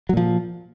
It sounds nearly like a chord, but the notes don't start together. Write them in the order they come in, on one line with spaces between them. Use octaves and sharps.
F#3 A#2 F3